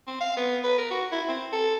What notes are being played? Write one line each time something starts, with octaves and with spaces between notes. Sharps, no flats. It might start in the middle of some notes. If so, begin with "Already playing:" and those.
C4
F5
B3
B4
A#4
F#4
E4
C4
A4